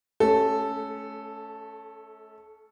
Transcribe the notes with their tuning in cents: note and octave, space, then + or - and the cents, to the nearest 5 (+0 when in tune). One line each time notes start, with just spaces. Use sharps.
A3 -35 C#4 +0 A4 +0